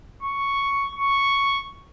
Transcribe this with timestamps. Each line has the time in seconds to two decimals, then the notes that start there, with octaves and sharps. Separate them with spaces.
0.23 C#6
0.95 C#6